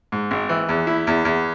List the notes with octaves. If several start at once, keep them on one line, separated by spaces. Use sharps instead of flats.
G#2
G#1
E3
E2
E4
E2
E2